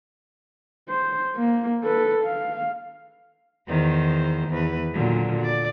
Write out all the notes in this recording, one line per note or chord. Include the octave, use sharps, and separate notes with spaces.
C5
A#3
A4 B4
F5
E2 D#3 C5
E2 B4
A#2 D3 F#3
D5